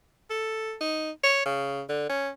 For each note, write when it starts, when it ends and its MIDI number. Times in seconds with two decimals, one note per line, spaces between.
0.30 0.75 69
0.81 1.11 63
1.23 1.44 73
1.45 1.82 49
1.89 2.05 50
2.09 2.29 61